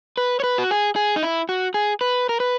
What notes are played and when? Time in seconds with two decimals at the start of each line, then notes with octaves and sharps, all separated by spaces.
0.17 B4
0.40 C#5
0.44 B4
0.58 F#4
0.71 G#4
0.96 G#4
1.16 D#4
1.23 E4
1.49 F#4
1.74 G#4
2.01 B4
2.29 A#4
2.40 B4